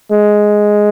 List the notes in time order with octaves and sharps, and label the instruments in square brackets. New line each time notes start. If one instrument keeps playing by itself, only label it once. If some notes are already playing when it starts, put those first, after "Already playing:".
[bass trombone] G#3